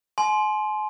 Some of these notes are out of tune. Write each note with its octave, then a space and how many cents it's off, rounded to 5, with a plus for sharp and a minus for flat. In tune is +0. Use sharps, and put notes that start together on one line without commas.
G#5 +40 C6 +0